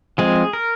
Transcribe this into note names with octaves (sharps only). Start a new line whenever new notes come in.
F3 G#3 C4 G#4
A#4